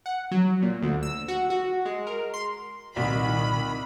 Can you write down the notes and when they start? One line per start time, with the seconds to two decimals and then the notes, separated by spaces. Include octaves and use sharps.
0.06 F#5
0.31 F#3
0.62 A#2
0.82 D2
1.03 E6
1.28 F#4
1.50 F#4
1.86 G#3
2.07 A#4
2.34 C6
2.96 C2 A#2 D#3 B5